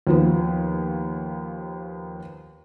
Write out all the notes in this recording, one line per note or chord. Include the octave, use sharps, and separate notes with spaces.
D#2 F3 B3